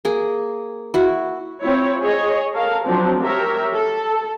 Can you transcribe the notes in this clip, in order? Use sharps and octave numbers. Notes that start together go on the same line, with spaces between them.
A#3 G#4
E4 F#4
C4 E4 F4 C#5
G#4 C#5 D#5
A4 A#4 F5
F3 F#3 C4 D4
G4 A#4 C#5 E5
A4